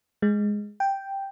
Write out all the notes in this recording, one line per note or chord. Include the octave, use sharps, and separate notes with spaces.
G#3
G5